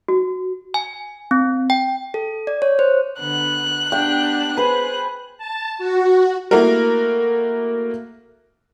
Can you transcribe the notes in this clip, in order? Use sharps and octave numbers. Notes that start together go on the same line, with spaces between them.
F#4
G#5
C4
G5
A4
D5
C#5
C5
D3 B3 F#6
B3 D4 G4 G5
G#4 B4 C5
A5
F#4
A3 A#3 E4 F#4 A#4